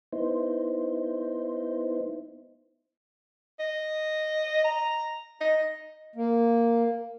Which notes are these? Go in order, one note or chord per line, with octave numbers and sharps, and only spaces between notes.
B3 D#4 E4 C5
D#5
A#5
D#5
A#3